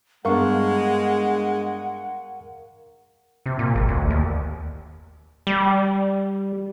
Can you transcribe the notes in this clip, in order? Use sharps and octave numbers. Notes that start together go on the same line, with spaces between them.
G2 G#3 B3 D4 A#4 F5 F#5 C#6
C3
A#2
G#1
D2
D#2
G3